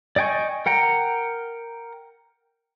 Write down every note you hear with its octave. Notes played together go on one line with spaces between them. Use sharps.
D5 D#5 G5 G#5 C#6
A#4 F#5 G5 A#5